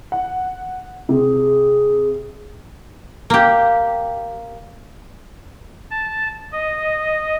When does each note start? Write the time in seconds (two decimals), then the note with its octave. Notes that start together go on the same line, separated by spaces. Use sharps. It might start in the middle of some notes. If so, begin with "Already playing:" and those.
0.12 F#5
1.09 C3 G#4
3.30 A#3 G4
5.91 A5
6.52 D#5